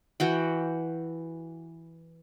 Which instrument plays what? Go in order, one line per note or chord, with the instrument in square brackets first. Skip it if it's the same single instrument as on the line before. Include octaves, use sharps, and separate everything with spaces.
[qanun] E3 F#4 G5